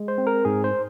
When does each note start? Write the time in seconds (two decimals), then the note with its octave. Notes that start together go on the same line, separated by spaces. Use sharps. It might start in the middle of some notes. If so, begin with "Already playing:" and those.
Already playing: G#3
0.08 C5
0.18 C4
0.27 A#4
0.45 G#2 G#4
0.64 C5